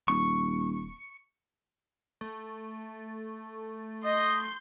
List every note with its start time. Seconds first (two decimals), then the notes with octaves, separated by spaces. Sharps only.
0.08 D#1 C#6
2.21 A3
4.04 D#5 C6 G6